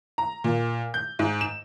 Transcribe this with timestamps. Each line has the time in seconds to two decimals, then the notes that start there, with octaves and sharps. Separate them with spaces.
0.18 A#5
0.44 A#2
0.94 G6
1.19 G#2
1.41 E7